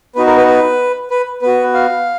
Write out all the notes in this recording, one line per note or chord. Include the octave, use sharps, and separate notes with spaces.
B3 D#4 F#4 B4
A#4
B4
B4
B4
B3 F#4 B4
F5